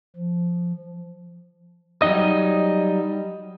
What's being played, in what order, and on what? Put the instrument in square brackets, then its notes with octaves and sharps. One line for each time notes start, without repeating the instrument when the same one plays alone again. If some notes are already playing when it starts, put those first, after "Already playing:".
[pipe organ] F3
[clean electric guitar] F#3 G3 D#4 D#5